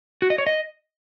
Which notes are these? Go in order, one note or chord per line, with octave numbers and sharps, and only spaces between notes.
F#4
D#5
C#5
D#5